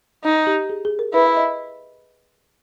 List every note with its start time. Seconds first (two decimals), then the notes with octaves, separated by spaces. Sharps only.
0.24 D#4 D#5
0.47 G4
0.70 G#4
0.85 G#4
0.99 A#4
1.14 E4 B4
1.26 E5
1.37 D#5